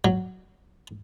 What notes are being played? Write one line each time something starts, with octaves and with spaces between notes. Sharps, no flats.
F#3